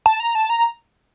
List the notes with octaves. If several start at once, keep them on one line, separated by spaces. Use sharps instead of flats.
A5
A#5
A5
A#5